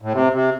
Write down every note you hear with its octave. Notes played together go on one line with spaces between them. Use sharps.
A2
C3
C3